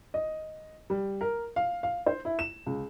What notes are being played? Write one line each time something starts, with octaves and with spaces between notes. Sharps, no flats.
D#5
G3
A#4
F5
F5
C5
E4
E7
C#2